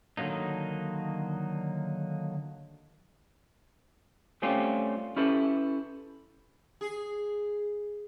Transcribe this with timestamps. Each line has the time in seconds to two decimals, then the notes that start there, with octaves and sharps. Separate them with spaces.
0.17 D3 D#3 F#3 A#3 D#4
4.42 G3 A3 C4 C#4 F4 G4
5.16 C#4 E4 G4 A4 B4
6.81 G#4